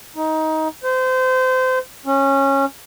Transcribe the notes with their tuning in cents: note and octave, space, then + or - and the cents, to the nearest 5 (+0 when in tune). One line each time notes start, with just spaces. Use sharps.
D#4 +20
C5 -25
C#4 -15